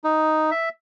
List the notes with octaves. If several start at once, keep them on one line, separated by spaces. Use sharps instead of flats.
D#4
E5